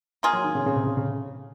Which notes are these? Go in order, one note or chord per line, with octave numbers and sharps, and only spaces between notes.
A#3 F4 G#4
F#3
D#3
C#3
C#3
C3
C#3
C#3